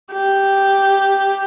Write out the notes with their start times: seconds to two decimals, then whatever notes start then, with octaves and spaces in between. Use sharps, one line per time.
0.13 G4